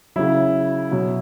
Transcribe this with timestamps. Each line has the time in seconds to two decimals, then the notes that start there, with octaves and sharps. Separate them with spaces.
0.16 C#3 F#3 E4
0.91 B2 F#3